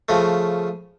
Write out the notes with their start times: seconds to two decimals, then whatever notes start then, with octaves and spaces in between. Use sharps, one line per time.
0.09 C#3 F3 A3